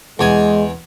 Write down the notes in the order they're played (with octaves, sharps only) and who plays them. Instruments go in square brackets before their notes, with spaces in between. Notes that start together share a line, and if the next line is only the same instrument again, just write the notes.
[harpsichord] E2 G#5 [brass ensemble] G#3